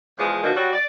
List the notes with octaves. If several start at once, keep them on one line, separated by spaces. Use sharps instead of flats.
E2 F3 G#3
D2 B2 D#3 F3 D4 F#4
F#3 G3 F#4
D5